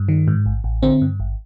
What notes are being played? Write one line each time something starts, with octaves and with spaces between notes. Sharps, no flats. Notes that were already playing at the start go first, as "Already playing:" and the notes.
Already playing: G2
D#3
G#2
A1
A1
D3 C4
G2
G#1